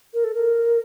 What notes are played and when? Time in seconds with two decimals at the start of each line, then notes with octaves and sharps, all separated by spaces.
0.14 A#4
0.24 A4
0.35 A#4